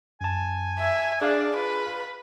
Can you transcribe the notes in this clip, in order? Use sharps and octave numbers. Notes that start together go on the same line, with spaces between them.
F#2 G#5 A5
E5
D4 G#4 D5 F5
F4 B4